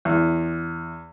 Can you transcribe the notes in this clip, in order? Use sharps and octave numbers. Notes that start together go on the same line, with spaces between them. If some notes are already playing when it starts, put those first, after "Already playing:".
E2